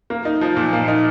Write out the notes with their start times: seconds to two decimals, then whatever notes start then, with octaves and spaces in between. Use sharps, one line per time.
0.10 A#3
0.25 D#4
0.41 F3
0.57 A#2
0.73 A#3
0.88 D#4